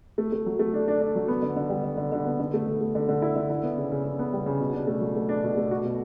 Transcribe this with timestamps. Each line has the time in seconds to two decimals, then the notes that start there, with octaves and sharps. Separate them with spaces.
0.18 A3
0.32 A3
0.46 F#3
0.59 A3
0.73 D4
0.88 D4
1.01 D4
1.15 F#3
1.28 B3
1.42 D3
1.56 D3
1.70 G3
1.84 D3
1.97 D3
2.12 D3
2.26 B3
2.40 D3
2.54 A3
2.66 D3
2.81 A3
2.95 D3
3.09 D3
3.22 E4
3.36 D3
3.50 E4
3.63 B3
3.77 C#3
3.91 C#3
4.04 C#3
4.19 B3
4.33 G3
4.46 C#3
4.61 B2
4.73 D4
4.87 A3
5.01 F#3
5.16 A3
5.29 D4
5.44 B2
5.57 A3
5.71 F#4
5.85 B2